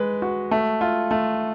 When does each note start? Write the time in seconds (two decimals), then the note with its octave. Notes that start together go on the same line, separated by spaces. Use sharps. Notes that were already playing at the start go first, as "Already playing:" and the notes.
Already playing: G#3 B4
0.22 F#4
0.51 A3
0.81 F4
1.11 A3